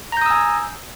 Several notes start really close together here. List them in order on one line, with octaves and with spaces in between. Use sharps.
A#5 G6 D#6 E6 G#5